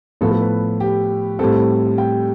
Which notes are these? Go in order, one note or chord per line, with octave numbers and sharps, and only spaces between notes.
A2 F3 B3 A4
A4
B4
G4
A2 G3 C4 A4
G5